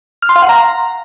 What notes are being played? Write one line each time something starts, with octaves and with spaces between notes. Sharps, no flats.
F6
C6
F5
F#5
A#5